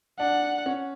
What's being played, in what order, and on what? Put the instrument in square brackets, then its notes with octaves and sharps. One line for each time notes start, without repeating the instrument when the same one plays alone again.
[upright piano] D4 [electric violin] F#5
[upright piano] C#4